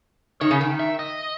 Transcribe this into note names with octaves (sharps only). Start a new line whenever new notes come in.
D#3 C#5
C#3
D#3
E5
D#5